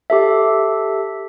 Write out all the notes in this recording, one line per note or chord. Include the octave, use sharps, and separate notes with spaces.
G4 A4 E5